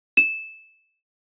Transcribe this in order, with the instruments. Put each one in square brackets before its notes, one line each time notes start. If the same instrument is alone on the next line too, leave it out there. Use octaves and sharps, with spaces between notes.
[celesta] E7